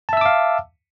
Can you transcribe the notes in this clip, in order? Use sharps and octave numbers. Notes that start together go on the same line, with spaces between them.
E5 F5 A5 D6 E6